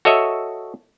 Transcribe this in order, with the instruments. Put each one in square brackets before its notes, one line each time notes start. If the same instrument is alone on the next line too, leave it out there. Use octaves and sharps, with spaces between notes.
[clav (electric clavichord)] F#4 A4 C#5 D#5 E5